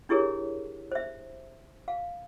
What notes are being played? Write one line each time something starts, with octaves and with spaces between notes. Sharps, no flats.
D4 E4 G4 G#4 A#4 C#5
C5 E5
F5